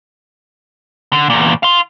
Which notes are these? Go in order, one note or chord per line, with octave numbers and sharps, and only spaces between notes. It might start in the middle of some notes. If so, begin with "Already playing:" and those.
D3
E2 A#2
F5 C6